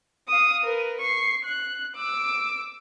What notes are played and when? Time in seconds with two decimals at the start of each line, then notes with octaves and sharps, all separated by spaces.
0.28 F5 D#6
0.63 A#4 B4
1.01 C#6 C7
1.45 F#6
1.96 D6 E6